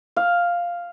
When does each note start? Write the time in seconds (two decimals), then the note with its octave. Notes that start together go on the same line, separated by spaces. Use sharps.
0.16 F5